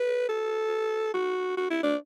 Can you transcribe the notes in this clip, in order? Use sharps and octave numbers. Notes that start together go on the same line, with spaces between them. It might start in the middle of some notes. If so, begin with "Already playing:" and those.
Already playing: B4
A4
F#4
F#4
E4
D4